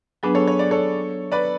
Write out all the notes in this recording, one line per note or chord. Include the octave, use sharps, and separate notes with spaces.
F#3 B3 D4 G#4 B4
A4 C#5
C#5
D5
A4 C#5
B4 D5